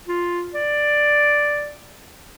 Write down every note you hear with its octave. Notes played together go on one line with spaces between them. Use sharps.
F4
D5